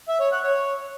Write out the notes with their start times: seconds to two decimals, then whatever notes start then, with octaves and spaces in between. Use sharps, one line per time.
0.08 E5
0.20 C#5
0.32 F#5
0.43 C#5